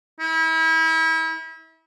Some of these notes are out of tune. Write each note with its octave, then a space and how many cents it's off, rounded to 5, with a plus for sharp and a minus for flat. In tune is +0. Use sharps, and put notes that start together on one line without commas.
E4 -35